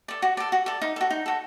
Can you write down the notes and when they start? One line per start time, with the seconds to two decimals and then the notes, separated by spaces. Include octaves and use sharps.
0.08 A4 D5
0.22 F#4
0.37 A4 D5
0.52 F#4
0.66 A4 D5
0.81 D#4
0.96 F#4 A4
1.10 D#4
1.26 F#4 A4